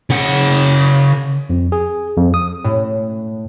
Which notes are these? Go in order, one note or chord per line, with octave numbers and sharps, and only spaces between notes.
C#3 F#5
F2
G#4
F2
D#6
A2